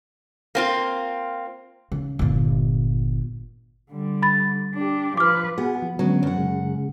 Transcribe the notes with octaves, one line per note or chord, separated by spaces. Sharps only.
A#3 C4 F4
C#3
G1 A#2
D3 G3
B5 A6
D4 G4
F3 B4 D6 F6
B3 F#4 G#4
F3
D3 F#3 G#3 B3 C#4
F#2 F#5
C#3 G#3